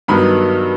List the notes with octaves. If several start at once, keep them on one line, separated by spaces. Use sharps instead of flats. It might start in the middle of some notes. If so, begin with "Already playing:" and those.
G2 D#3 F#3 B3 B5